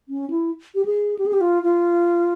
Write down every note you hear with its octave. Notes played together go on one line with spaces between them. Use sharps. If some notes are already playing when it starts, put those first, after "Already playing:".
C#4
E4
G4
G#4
G4
G#4
G4
F4
F4